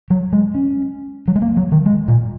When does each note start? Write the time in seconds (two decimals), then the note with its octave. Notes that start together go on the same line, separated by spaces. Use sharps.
0.10 F#3
0.33 G#3
0.55 C#4
1.28 F#3
1.35 G#3
1.42 A#3
1.57 F#3
1.72 D#3
1.86 G#3
2.08 A#2